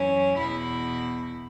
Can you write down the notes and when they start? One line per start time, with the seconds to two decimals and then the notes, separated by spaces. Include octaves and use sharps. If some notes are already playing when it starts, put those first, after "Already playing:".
Already playing: F#2 E3 C#4
0.37 E2 B2 E4